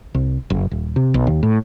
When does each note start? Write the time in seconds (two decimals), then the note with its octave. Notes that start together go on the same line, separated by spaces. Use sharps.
0.15 C2
0.50 F#1
0.71 D#1
0.96 C3
1.14 B1
1.27 D#2
1.43 A2